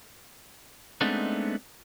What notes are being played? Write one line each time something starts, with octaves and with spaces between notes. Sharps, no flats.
G#3 A3 B3 C4 D4 D#4